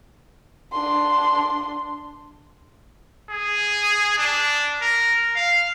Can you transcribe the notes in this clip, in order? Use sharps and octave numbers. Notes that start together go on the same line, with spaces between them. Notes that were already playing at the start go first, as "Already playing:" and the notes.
D4 C6
G#4
D4
A#4
F5